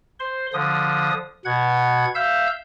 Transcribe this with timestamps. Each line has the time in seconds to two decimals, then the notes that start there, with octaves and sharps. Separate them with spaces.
0.20 C5 C6
0.53 D3 F3 D#6
1.45 B2 F#5 G#6
2.15 E5 F5 E6 G6